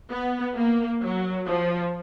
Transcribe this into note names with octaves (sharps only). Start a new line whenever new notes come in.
B3
A#3
F#3
F3